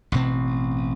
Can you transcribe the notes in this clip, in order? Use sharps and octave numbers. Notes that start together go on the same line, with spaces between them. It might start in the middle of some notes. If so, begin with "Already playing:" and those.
A1 G2 B2 C4